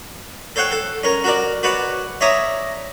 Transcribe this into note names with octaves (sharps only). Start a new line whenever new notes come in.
A4 C5 C#5 F#5 G5
A4
C#4 A#4
F#4 A#4 D5
F#4 B4 C#5 D5 F#5
C#5 D5 E5 A#5 D#6